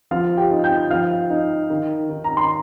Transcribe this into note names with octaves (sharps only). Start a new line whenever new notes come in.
F3 F4 F5
G4 G5
D#4
G5 G6
F3 F5 F6
D#4
D#3
D#3
A#5
C6